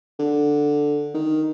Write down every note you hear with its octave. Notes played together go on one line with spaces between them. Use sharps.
D3
D#3